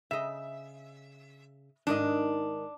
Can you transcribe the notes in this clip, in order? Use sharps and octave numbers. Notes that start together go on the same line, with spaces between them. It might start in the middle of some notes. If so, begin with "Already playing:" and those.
C#3 D#5 E5
G#2 D#3 D4 D#5